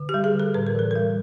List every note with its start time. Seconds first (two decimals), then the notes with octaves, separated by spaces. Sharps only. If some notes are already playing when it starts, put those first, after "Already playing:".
Already playing: D3
0.09 G4
0.14 G3
0.24 G#4
0.34 D3
0.40 A4
0.54 A2 B4
0.67 A#4
0.75 E3 A4
0.91 G3 A#4